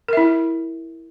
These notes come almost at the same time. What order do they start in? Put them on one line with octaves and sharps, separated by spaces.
A#4 E5 E4